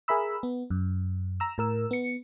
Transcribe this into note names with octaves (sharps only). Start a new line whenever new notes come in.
G#4 A#4 E5 B5 E6
B3
F#2
A#5 E6
A2 A#4 E6
B3 C#7